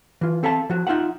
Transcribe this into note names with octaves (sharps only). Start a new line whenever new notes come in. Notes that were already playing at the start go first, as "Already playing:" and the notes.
E3 F4
C4 A4 E5 F5 A5
F3 F#4
D#4 F4 E5 F#5